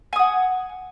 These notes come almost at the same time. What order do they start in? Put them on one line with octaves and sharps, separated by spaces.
G#5 D#6 F#5